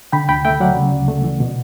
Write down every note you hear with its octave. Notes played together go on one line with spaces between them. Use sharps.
D3 G5 B5
D2 G5 B5
A3 E5 G5
F#3 D5 F#5
C#3
D2
A3
E3
B2